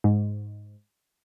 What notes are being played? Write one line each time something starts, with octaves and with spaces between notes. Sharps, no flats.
G#2